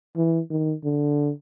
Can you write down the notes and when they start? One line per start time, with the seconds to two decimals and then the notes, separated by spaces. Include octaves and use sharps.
0.17 E3
0.50 D#3
0.84 D3